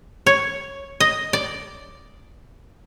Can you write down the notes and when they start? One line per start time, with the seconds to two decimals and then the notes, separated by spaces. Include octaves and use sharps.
0.26 C#5
1.00 D#5
1.33 D5